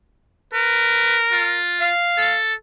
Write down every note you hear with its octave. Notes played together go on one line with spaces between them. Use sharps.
A#4 B4
F4
F5
A4